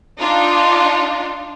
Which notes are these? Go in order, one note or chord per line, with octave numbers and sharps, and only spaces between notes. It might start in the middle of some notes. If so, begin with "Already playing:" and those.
D4 D#4 F4